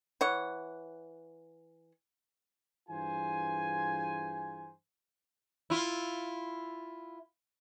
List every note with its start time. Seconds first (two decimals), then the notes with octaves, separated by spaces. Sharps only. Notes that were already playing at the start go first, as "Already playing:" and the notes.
0.21 E3 C#5 F#5
2.89 G2 E3 F4 G#4 C5 G#5
5.70 E4 F4